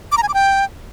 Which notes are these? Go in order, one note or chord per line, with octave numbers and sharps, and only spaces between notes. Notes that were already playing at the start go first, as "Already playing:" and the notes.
D6
A#5
G#5
D6
G5